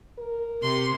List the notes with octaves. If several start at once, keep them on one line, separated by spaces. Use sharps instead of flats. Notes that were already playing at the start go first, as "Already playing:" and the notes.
A#4
C3 C6